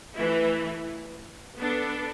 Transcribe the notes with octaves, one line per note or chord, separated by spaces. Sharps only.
E3 A3 E4
B3 D4 A4